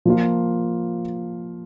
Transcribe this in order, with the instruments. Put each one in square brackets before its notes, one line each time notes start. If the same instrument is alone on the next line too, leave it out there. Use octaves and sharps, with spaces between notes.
[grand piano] F3 A#3 F4